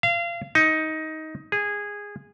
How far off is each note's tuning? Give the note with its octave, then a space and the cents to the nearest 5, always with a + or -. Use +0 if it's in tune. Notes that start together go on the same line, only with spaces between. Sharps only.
F5 -30
D#4 +15
G#4 -15